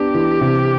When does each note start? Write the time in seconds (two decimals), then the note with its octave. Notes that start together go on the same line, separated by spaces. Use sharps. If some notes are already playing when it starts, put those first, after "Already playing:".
Already playing: B3 D4 G4
0.14 E3
0.41 C3